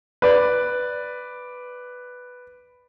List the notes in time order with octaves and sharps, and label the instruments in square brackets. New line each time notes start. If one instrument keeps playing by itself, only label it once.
[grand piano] B4 D5